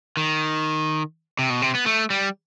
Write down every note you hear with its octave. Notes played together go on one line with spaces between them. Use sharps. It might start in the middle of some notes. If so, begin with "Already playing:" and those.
D#3
C3
B2
C3
B3
A3
G3